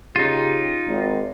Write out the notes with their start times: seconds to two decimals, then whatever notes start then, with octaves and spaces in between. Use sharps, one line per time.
0.16 C#3 D#4 F4 G4
0.87 G#1